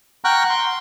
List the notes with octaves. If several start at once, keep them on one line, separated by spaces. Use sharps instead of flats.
F#5 G5 A#5 C#6 F6 F#6
C6